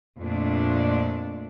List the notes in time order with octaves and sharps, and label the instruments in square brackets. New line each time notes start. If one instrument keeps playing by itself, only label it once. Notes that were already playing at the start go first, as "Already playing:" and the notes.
[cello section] F2 A#2 A3 D4